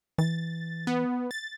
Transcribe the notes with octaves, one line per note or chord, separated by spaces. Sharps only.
E3 A6
B3
A6